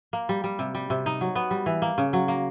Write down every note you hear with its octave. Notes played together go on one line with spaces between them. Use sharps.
A#3
G3
G3
C3
G3
C3
D#4
F#3
B3
G3
E3
A#3
C#3
F#3
A#3